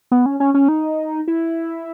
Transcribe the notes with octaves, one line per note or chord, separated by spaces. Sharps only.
B3
C#4
C#4
C#4
D#4
E4